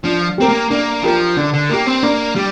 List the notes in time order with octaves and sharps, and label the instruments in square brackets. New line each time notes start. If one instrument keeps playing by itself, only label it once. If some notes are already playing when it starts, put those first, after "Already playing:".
[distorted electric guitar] F3 [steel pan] D4
[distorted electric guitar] C4 [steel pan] G4 A#4
[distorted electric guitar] A#3
[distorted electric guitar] A#3 [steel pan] D4
[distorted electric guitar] F3 [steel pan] G4 A#4
[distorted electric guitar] D3 [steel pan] D4
[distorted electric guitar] D3
[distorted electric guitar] A#3 [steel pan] G4 A#4
[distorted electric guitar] C4
[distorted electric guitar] A#3 [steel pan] D4
[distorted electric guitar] G3 [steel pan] G4